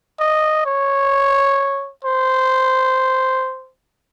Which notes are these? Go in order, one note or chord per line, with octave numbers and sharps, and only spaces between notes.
D#5
C#5
C5